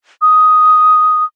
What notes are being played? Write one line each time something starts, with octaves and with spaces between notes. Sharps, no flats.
D#6